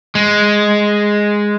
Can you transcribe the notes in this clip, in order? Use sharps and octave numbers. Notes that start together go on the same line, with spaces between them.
G#3